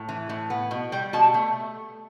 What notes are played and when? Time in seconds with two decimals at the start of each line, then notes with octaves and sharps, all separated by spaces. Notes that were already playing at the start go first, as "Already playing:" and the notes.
Already playing: A2
0.09 E3
0.29 A2
0.50 B3
0.71 B2
0.92 G3 G5
1.13 B2 A5
1.34 A3